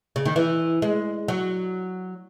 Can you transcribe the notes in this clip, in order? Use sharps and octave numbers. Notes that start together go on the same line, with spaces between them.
C#3
D#3
E3
G#3
F#3